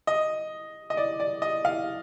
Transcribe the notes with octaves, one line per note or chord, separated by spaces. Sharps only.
D#5
D#5
D5
D5
D#5
F5